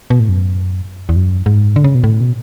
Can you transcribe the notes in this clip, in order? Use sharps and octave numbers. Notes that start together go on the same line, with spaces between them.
B2
A2
F#2
E2
F#2
G#2
D3
C#3
B2
A2
B2